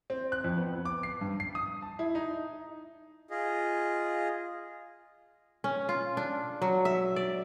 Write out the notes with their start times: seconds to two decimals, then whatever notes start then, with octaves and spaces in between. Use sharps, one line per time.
0.10 C4
0.32 F#6
0.44 F2
0.58 B3
0.85 D6
1.03 C7
1.21 G2
1.40 C7
1.55 D#6
1.82 A5
1.99 E4
2.15 D#4
3.30 F4 G#4 D#5
5.64 C#4
5.89 F4
6.17 D4
6.61 F#3
6.85 E5
7.16 D5